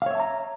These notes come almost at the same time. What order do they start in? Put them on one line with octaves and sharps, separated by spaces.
F5 C#5 E5 A5 A#5